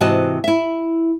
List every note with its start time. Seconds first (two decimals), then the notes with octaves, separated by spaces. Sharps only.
0.01 G#2 C3 E3 F#4 D#5 A5
0.44 E4 E5